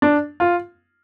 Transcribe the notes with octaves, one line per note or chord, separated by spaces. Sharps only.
D4
F4